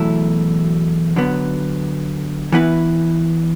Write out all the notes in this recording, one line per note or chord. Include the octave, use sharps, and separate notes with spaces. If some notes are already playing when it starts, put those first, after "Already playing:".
Already playing: E2 B2 F#3 A3 E4
D3 F#3 B3
E3 B3 E4 B4